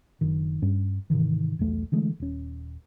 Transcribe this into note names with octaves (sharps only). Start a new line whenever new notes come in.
F#1 D#3
G2 C#4
G#2 C3 D#3 E3
B1 E2 A3
D3 E3 G#3 A3
D#1 C#4